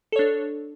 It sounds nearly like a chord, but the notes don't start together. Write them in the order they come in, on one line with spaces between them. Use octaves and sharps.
A4 C#5 D4